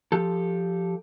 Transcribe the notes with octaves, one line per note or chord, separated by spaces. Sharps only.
F3 G4 A4